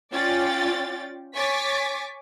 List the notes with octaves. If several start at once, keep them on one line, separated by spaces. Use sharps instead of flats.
C#4 F4 D5 G5 A6
C#5 G#5 C#6 D6 A6 B6